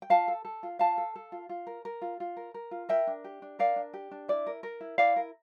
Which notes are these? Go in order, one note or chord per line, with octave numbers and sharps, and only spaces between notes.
G5
F4 F5 A5
A4
A4
F4
F4 F5 A5
A4
A4
F4
F4
A#4
A#4
F4
F4
A#4
A#4
F4
A#4 E5 G5
D4
G4
D4
A#4 D5 F5
D4
G4
D4
E4 D5
A#4
A#4
E4
E4 D5 F5
A#4